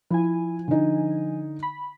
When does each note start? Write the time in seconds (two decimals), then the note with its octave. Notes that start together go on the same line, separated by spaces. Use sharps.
0.10 F3 E4 G#5
0.68 D3 D#4
1.63 B5